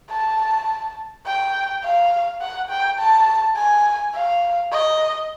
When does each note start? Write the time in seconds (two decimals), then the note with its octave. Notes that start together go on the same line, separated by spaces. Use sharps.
0.10 A5
1.26 G5
1.84 F5
2.41 F#5
2.70 G5
2.99 A5
3.56 G#5
4.14 F5
4.72 D#5